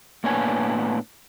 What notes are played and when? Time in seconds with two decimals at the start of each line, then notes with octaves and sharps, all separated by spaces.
0.24 A2 A#3 B3 D4 C#5 G#5